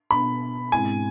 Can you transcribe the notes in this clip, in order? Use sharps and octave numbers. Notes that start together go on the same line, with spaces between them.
B2 B3 D4 B5
G#2 G#3 C4 E4 G#5